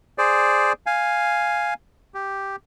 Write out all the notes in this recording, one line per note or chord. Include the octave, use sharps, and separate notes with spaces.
G#4 C5 D5
F5 G#5
G4